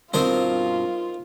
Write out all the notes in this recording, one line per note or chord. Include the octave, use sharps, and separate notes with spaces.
G2 B2 C4 D#4 F4 A#4 C5